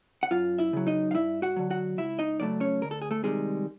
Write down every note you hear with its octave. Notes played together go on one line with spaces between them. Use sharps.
F#5
F#2 F4 F5
E4 E5
C#3 F#3
D#4 D#5
F5
G2 E4 E5
F#4 F#5
D3 F#3
F#4 F#5
C#2 E4 E5
D#4 D#5
C#3 F#3 A3 D4 D5
C#4 C#5
D2 A#4
A4
G#4
A3 A4
C3 D#3 G3 G#3 G#4